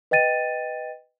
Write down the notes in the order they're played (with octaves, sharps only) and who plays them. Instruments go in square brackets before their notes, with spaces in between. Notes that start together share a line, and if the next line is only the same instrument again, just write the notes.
[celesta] B4 D#5 G5 A6 D#7